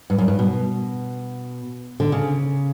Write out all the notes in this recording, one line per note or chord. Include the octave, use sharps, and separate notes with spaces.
G2
F#2
G2
B2
D3
C#3